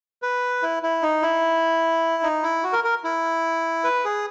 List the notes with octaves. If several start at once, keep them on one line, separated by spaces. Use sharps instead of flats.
B4
E4
E4
D#4
E4
D#4
E4
F#4
A#4
A#4
E4
B4
G#4